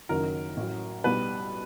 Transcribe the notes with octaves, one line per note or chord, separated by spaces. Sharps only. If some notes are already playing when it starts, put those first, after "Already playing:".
F#1 F#2 D#3 F#3 A#4
A1 A2 F#3
B1 B2 G3 B4